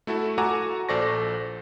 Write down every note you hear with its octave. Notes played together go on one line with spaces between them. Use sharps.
A3 E4 F#4 A4
F#4 A4 F#5 G#5 A#5 D6
A#1 A4 C5 D5 C#6 A#6